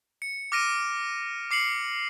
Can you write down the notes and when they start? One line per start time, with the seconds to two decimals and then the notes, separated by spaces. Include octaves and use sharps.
0.22 C#7
0.52 D6 F6 A#6 D7 D#7
1.51 D6 C7 C#7 F#7